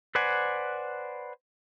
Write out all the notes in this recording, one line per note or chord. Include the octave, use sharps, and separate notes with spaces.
B4 C5 D5 F#5 G#5